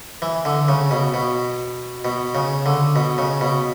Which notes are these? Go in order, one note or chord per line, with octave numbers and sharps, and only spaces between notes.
E3
D3
C#3
B2
B2
B2
C#3
D3
B2
C#3
B2